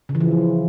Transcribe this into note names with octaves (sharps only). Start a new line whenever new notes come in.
C#3
E3
F3